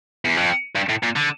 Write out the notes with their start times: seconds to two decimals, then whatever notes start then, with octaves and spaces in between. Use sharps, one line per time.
0.25 E2
0.37 F2
0.75 G2
0.89 A2
1.03 A#2
1.16 D3